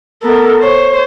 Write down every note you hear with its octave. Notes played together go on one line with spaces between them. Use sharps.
B3 A4 A#4
C5 C#5